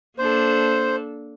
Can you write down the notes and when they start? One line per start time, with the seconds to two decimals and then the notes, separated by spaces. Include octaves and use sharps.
0.18 A#3 D4 A4 C5